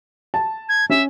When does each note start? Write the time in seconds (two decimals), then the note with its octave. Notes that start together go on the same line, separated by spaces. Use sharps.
0.34 A5
0.69 G#6
0.90 C#4 E5